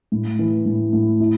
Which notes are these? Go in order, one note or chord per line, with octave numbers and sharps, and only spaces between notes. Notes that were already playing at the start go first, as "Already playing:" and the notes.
A2
E3
A2
A2
E4